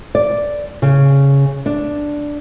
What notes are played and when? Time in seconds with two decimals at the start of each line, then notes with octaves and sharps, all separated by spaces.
0.15 D5
0.82 C#3
1.66 D4